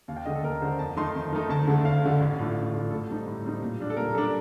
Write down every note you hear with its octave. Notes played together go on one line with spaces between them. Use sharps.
D#2 F5
G5
D3 A3 D#5
A4
D#2 A#4
D3 A3 C5
F2 A5
D#3 A3 D#4 C6
F2
D#3 A3 D#4
D2 A5
D3 A3
D2 F5
D3 A3
A1
A2 A3 D4 F4
A1
A2 A3 D4 F4
A2 A4
G3 C4 D#4
A2
G3 C4 D#4
A#2
G3 D4
A4
A#2 A#4
G3 D4 A4